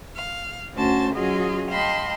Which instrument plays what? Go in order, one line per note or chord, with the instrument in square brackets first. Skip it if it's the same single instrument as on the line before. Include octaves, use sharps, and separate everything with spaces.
[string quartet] F5
D2 C#4 F#4 C5 A5 A6
F#3 C#4 F4 F#4 G#4 D#5
D#5 F5 G5 A5 B5 C6